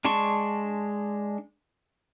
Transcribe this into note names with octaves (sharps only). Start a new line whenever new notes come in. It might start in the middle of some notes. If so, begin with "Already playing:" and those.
G#3 D4 A5 C6 C#6